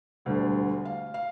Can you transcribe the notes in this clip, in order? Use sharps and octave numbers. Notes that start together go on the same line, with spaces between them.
E1 D2 D3 G3
F5
F5